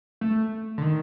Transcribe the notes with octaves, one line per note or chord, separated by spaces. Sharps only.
A3
D3
D#3